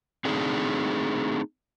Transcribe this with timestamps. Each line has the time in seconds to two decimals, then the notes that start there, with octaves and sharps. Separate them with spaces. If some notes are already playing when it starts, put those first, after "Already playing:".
0.25 A3 C4 D4 D#4 G#4